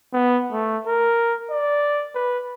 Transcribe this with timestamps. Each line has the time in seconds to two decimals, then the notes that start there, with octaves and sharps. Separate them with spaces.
0.13 B3
0.51 A3
0.87 A#4
1.50 D5
2.15 B4